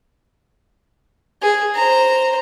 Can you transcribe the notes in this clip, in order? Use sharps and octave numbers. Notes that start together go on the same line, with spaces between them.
G#4
C5 A#5